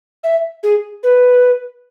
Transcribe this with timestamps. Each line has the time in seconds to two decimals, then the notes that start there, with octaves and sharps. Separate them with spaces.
0.24 E5
0.63 G#4
1.03 B4